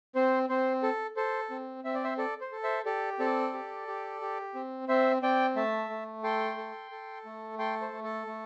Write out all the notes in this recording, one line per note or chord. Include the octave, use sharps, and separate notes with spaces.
C4 C5
C4 C5
A4
A4 C5
C4
C4 E5
D5
C5 E5
A4 D5
C5
A4
C5 E5
G4 A4 D5
C4 A4 D5
G4
G4
G4
C4
C4 C5 E5
C4 D5 G5
A3 E5 A5
A3
A4 G5 C6
A4
A4
A3
A4 G5 C6
C5
A3
A4
A3